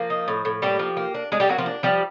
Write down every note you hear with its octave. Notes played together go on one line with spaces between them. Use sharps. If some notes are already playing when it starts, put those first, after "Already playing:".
Already playing: F3 A#3
D#4
A2
A2
G3 A#3 G4
F3
A#3
D4
G#3 D4 G#4
G3 G4
F#3 A#3 F#4
F3 F4
D4
F3 G3 G4